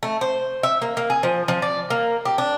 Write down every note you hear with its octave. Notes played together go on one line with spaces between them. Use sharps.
A3
C5
E5
A#3
A#3
G#4
F3
F3
D5
A#3
G4
D4